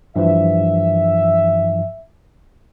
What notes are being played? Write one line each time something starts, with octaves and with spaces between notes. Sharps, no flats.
G2 E3 F3 E5